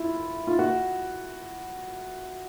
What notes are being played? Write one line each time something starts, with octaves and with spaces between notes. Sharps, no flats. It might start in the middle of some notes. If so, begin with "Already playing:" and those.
Already playing: E4 F4
F4
F#4